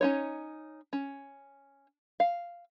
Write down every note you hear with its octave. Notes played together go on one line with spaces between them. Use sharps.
C#4 D#4 C#5
C#4
F5